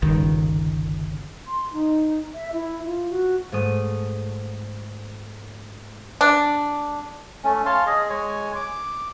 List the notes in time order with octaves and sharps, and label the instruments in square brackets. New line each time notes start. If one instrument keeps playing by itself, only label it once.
[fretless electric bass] G1 C#2 D#3
[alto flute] C6
D#4
E5
E4
F4
F#4
[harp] G#2 A3 D#6
[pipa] D4
[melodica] A3 C#4
C#5 F5 A5 C6
G#4 D#5
G#3 C#5 G#5
D6